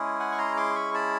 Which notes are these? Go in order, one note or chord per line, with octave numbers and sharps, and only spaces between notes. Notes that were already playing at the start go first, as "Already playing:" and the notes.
Already playing: G#3 C#4 E4 G#4
F#5 G#5
C#6
A#5 C6
C6 D6
B5 C#6
A5 B5